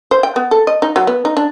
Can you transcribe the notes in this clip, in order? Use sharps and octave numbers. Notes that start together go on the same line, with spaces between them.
C5
G5
B3
A4
D#5
D#4
F#3
B3
D#4
D4